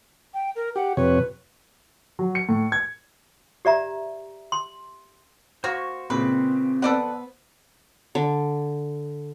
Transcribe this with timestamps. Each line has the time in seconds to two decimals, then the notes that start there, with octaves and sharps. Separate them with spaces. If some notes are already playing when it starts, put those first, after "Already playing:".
0.34 G5
0.56 A#4
0.76 G4 F#5
0.97 F2 C3 B4 C#5
2.19 F#3
2.35 C#7
2.49 A2
2.72 G#6
3.65 G4 D5 E5 A#5
4.52 C6
5.64 A#3 F#4 C5 C#6
6.10 A#2 C#3 G#3 C4 B4
6.82 B3 A4 B4 C5 D5 F#5
8.15 D3